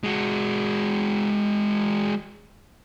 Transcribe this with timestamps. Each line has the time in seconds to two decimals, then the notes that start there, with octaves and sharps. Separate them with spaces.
0.04 G#3 F#4